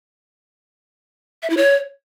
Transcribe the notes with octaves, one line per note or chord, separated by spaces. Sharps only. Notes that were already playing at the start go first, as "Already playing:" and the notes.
E5
E4
C#5